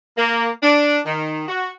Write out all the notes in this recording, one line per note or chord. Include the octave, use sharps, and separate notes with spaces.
A#3
D4
D#3
F#4